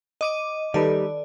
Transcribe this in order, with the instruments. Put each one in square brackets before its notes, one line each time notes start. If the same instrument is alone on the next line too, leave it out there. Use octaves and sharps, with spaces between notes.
[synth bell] D#5 D6 D#7
[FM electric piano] D#3 A4 B4 [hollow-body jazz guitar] G3 D#4 [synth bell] D5